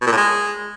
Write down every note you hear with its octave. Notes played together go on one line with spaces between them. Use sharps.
B2
A#2
A2
G#3